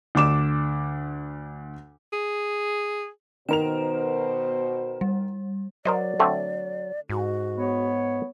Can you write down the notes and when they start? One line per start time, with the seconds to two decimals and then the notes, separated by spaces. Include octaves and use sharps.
0.15 D2 D4 D6 E7
2.13 G#4
3.49 B2 D#3 B3 A#4 C5 E7 F7
5.01 G3
5.85 F#3 A#4 C5 D5 D#5
6.20 D3 A3 C4
7.10 G#2 F#4
7.58 B3 C#5